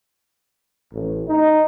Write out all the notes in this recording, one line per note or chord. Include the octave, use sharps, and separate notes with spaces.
A1
D#4